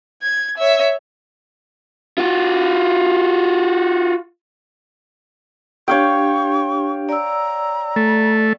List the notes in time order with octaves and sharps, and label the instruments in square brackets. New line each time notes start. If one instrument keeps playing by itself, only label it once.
[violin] G#6
C#5 E5
[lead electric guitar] F4 F#4
[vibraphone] D4 G4 [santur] C#5 F5 G5 [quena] C#6
[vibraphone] D5 E6 [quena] A#5
[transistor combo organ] A3